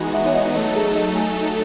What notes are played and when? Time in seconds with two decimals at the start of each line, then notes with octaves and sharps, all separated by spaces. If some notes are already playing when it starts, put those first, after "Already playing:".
Already playing: E3 G#3 B3 D#4 F#4
0.14 E5
0.26 C#5
0.34 D#5
0.50 D#5
0.54 F#3 A3 D#4 A4 C#5
0.75 G#4
0.96 D#5
1.15 G#5